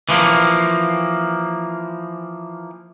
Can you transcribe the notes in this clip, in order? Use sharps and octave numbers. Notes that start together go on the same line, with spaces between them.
E3 F3 A#3